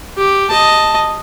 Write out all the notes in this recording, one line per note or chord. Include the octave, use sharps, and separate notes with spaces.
G4
D#5 A5